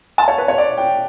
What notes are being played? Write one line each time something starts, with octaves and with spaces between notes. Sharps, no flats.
A5
C#5
B4
C#5
D5
G5